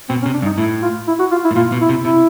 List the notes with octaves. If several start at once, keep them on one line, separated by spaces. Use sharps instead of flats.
B2 C4
C#4
C3
D4
G2
D#4
A2 E4
F4
E4
F#4
F4
E4
A2
A#2 F4
B2
E4
C3
C3 E4